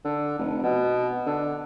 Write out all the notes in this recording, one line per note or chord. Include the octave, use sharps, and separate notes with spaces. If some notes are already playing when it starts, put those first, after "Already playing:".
D3
F1
B2
D3